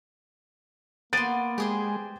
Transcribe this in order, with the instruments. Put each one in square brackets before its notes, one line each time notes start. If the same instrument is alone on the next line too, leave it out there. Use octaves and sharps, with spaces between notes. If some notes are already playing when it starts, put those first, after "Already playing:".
[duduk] A#3 [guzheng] B3 C6 [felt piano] A6 D7 D#7
[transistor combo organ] G#3 [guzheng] G4 G#4 C5